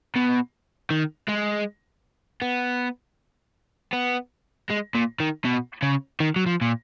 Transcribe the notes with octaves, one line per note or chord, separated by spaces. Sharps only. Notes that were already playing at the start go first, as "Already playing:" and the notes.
B2
D#3
G#3
B3
B3
G#3
A#2
D#3
B2
C#3
D#3
F#3
F3
A#2